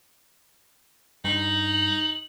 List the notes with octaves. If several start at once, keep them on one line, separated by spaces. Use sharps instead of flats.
G2 D#4 F#7